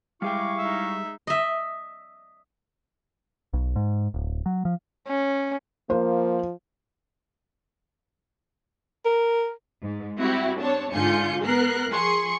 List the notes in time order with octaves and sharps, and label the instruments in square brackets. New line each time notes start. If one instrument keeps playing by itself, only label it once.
[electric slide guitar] G3 G#4 G5 [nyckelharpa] G#3 D6 [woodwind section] E4 F5 C#6
[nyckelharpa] G#3 D#4 [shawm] E5
[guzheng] D#5 E5
[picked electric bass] B1
G#2
D1
F#3
F3
[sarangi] C#4
[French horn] F3 [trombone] A#3 [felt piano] C5
[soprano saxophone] A#4
[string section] G#2
G3 C4 E4 F#4 G4
C4 D4 C#5 A5
G#2 D3 F4 G#5 G6 C#7
B3 A#4 F#6 C7
F3 G#4 C6 C#6 C#7